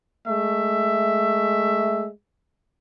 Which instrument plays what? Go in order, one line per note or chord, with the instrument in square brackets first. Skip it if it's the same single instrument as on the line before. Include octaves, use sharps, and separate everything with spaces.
[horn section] G#3 A3 E5